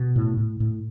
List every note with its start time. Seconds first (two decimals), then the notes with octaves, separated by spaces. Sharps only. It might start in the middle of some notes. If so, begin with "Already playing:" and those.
Already playing: B2
0.16 A2
0.37 A2
0.60 A2